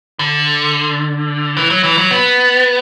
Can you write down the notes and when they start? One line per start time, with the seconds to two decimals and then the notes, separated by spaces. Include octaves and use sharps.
0.19 D3
1.57 E3
1.70 F#3
1.84 E3
1.98 F#3
2.11 B3